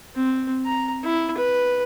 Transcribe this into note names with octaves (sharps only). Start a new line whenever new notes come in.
C4
A#5
E4
B4